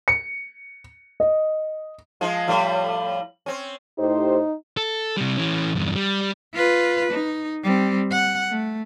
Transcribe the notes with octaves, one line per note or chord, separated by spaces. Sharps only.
C#7
D#5
F3 G#3
A2 F3 G3
C4 C#4
A2 D#4 G4 C5
A4
C3 G3
E3 C#4
E2 G2
G3
F4 B4
D#4
G3 C4
F#5
A3